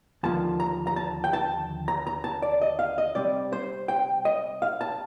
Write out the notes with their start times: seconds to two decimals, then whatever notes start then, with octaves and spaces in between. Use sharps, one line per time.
0.23 D#2 D3 F3 A#3 A5
0.60 A#5
0.87 A#5
0.96 A5
1.24 G5
1.33 A5
1.88 A#5
2.07 A#5
2.24 A5
2.42 D5
2.61 D#5
2.79 F5
2.98 D#5
3.15 C3 G3 C4 D5
3.53 C5
3.88 G5
4.25 D#5
4.62 F5
4.81 A5